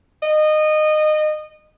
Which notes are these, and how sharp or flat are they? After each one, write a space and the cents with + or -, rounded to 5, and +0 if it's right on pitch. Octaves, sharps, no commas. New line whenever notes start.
D#5 -20